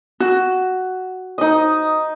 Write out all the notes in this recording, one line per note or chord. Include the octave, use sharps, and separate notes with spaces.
F#4
D#4 D#5